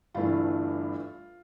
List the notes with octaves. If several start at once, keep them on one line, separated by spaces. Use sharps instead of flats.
G1 G2 E3 A3 F4